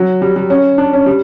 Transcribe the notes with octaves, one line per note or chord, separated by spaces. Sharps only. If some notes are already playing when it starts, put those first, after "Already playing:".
Already playing: F#3
G3
G3
C#4
D4
C#4
G3